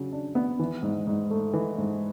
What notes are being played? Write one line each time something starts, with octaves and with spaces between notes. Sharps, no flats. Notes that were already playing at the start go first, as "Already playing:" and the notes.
Already playing: C#3 F#3
D4
B3
E3
G#2
G#2
A3
E3
G#2